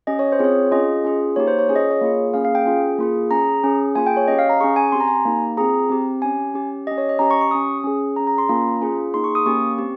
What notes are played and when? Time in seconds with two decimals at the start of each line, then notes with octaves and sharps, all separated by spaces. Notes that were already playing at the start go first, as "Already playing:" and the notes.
0.07 C#4 G4 D#5
0.19 C#5
0.32 C5
0.39 C4 F4 G#4 C#5
0.72 C#4 F4 G#4 D#5
1.04 C#4 F4 G#4
1.36 A#3 D#4 G4 C#5
1.48 C5
1.59 C#5
1.69 C#4 F4 G#4 C#5
1.76 D#5
1.80 C#5
1.91 C#5
2.01 A#3 F4 G#4
2.34 A#3 C#4 G#4 F5
2.45 F5
2.55 G5
2.66 C#4 F4 G#4
2.98 A#3 F4 G#4
3.31 C#4 G#4 A#5
3.64 C#4 G#4
3.96 A#3 F4 G#4 G#5
4.07 G5
4.17 C#5
4.28 C#4 G4 D#5
4.39 F5
4.49 A#5
4.61 C#4 G#4 C#6
4.76 G#5
4.92 C4 G4 C6
5.00 A#5
5.07 G#5
5.15 A#5
5.25 A#3 D#4 G4
5.57 C4 F4 G#4 A#5
5.90 C4 G4
6.22 C#4 G4 G#5
6.54 C#4 G4
6.87 C#4 G4 D#5
6.98 C#5
7.09 D#5
7.19 C#4 G4 A#5
7.31 C#6
7.41 C#6
7.51 C#4 G4 D#6
7.84 C#4 G#4
8.16 C#4 G#4 A#5
8.27 A#5
8.38 C6
8.49 A#3 C#4 F4 A#5
8.81 C#4 F4 G#4
9.14 A#3 D#4 G#4 C6
9.24 C#6
9.35 D#6
9.46 A#3 C#4 G4 C#6
9.78 C4 G4